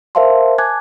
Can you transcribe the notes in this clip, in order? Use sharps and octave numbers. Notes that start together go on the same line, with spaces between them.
A#4 C5 E5 F5 A5 C6
G#5 A5 D6 F#6 G#6